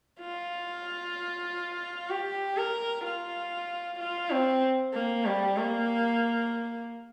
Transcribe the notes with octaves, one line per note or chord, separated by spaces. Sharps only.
F4
G4
A#4
F4
F4
C4
A#3
G3
A#3